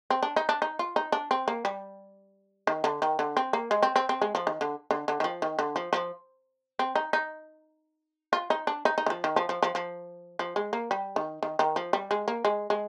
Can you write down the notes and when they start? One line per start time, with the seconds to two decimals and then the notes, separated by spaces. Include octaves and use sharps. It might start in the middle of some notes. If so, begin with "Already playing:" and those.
0.10 C4
0.23 D4
0.36 D#4
0.49 D4
0.62 D#4
0.79 F4
0.96 D#4
1.12 D4
1.31 C4
1.48 A#3
1.65 G3
2.67 D#3
2.84 D3
3.02 D#3
3.19 D3
3.37 C4
3.53 A#3
3.71 G#3
3.83 C4
3.96 C4
4.09 C4
4.22 G#3
4.35 F3
4.47 D#3
4.61 D3
4.91 D3
5.08 D3
5.20 D#3
5.24 F3
5.42 D#3
5.59 D3
5.76 F3
5.93 F3
6.79 C4
6.96 D#4
7.13 D#4
8.33 F4
8.50 D#4
8.67 D4
8.85 D#4
8.98 D#4
9.06 D#3
9.10 F3
9.24 D#3
9.36 F3
9.49 F3
9.63 F3
9.75 F3
10.39 F3
10.56 G#3
10.73 A#3
10.91 G3
11.16 D#3
11.43 D#3
11.59 D#3
11.76 F3
11.93 G3
12.11 G#3
12.28 A#3
12.45 G#3
12.70 G#3